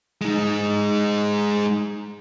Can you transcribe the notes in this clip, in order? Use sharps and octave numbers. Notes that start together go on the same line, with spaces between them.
G#3 D#4